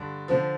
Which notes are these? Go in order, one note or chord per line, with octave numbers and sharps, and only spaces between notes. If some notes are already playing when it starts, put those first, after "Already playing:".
Already playing: G2 D3
D3 F3